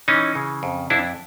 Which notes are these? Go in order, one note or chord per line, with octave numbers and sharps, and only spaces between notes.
E3 C#4 D#4
C#3
F2
F2 D4 E4